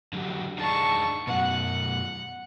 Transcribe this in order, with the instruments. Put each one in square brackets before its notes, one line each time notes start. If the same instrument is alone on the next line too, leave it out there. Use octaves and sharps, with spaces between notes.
[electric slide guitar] D3 F#3 G4
[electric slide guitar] D4 D#4 G#4 [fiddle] A5 C#6
[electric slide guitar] F#2 B2 [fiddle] F#5